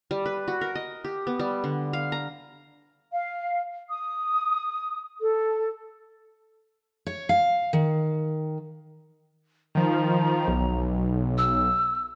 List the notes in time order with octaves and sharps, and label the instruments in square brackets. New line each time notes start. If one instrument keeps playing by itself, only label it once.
[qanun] G3
B4
F#4
A#4
D#5
G4
B3
G3
D3
F5
A#5
[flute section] F5
D#6
A4
[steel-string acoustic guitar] C#5
F5
D#3
[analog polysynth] D#3 F3 [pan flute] A#5
[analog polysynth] B1
[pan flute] E6